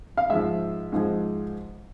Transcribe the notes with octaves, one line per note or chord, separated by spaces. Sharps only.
F5
G#2 F3 G#3 E5
G#2 F3 G#3